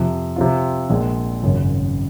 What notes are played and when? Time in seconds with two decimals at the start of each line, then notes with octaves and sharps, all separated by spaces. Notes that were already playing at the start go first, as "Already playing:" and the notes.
Already playing: F2 C3 F3
0.36 C3 F3 C4 F4
0.89 A#1 A#2 G#3
1.43 G#1 F#2 C#3